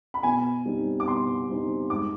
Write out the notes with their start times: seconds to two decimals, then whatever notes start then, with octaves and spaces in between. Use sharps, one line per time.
0.14 B5
0.23 B2 G#5
0.65 G3 C4 D#4
1.00 D6
1.07 B2 C6
1.49 G3 C4 D#4
1.90 G#2 D6